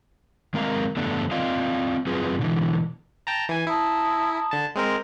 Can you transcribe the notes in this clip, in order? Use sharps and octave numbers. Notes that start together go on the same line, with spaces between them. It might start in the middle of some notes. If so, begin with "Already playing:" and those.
D#3 G#3 C4 A#4 F5 A#5
F2 D3 A3 B3 D4 A4
C4 F4 D5 D#5 F5
F#2 C4 F4 G#4 B4
B2 D3 E3
G5 A5 A#5
E3 G#5
E4 A5 A#5 D#6
D3 A5
G#3 C4 A#4